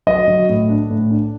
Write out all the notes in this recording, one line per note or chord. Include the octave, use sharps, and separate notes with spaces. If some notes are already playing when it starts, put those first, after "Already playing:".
F#3 D#5
F#3
A2
D4
A2
D4